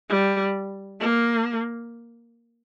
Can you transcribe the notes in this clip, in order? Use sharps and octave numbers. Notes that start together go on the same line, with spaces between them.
G3
A#3